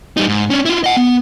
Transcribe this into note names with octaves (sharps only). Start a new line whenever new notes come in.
G3 D#4
G#2
C#4 D4
E4 F4
D#5 F#5
B3